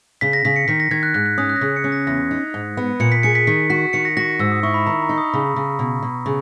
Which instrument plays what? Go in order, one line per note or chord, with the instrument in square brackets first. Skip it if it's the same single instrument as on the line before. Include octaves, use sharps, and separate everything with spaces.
[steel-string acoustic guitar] C#3 [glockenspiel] B6
[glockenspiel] A#6
[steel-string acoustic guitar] C#3 [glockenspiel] B6
[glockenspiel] C#7
[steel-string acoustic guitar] D#3 [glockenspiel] B6
[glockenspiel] A#6
[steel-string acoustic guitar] D#3 [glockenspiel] G#6
[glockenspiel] F#6
[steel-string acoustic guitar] G#2 [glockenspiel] F#6
[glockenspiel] F#6
[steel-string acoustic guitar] C#4 [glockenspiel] D#6
[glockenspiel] F#6
A#6
[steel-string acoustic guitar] C#3 [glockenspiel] B6
[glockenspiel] C#7
[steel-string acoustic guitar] C#4
[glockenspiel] A#6
[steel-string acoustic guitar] E2 [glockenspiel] A#6
[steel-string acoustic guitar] D#4
G#2
B3
[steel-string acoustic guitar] A#2 [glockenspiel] C#7
[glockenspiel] B6
[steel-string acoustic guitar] G#4 [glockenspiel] C#7
[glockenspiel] B6
[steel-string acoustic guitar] D#3 [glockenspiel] B6
[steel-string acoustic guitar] F#4 [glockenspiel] B6
[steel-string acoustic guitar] D#3 [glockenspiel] C#7
[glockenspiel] A#6
[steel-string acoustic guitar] F#4 [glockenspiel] A#6
[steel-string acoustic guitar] G#2 [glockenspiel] E6
[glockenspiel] D#6
[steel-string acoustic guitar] E4 [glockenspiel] C#6
[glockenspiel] B5
[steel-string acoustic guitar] D#3 [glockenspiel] A#5
[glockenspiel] A#5
[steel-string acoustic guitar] D#4
[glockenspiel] D#6
[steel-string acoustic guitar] C#3 [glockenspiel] B5
[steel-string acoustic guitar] C#3
B2
B2
C#3